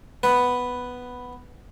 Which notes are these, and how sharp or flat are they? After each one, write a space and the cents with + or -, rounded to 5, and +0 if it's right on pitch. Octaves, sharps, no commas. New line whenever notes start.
B3 +0 B4 +0